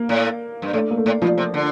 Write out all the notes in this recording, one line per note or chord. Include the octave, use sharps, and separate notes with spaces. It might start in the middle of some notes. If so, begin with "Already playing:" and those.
Already playing: A#3
A2
G2
A2 A3
A#3
A3
A2
A#2 F3
C3
D3